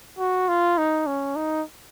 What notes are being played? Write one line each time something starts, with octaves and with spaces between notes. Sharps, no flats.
F#4
F4
D#4
C#4
D#4